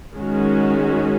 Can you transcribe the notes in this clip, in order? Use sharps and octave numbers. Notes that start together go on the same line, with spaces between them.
D#3 G#3 C#4 F#4